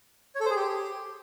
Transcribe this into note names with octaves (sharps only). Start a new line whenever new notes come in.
C#5
A4
C5
G#4
G4